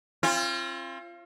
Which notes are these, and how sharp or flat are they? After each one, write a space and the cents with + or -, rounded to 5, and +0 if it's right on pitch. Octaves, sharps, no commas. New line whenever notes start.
C4 +40 F4 -25